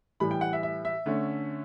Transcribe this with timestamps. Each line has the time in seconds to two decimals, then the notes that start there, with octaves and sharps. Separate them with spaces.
0.20 A2 E3 G3 B5
0.31 G5
0.41 F#5
0.53 E5
0.63 E5
0.85 E5
1.06 D3 A3 C#4